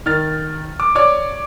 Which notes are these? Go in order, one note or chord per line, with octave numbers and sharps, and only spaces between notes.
D#3 F6 A6
D6
C#5 D5 D6